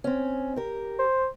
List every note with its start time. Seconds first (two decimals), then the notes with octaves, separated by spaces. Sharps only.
0.04 C4 C#4
0.56 G4 A#4
0.99 C5